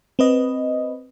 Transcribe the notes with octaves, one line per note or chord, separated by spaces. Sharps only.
C4 B4 D#5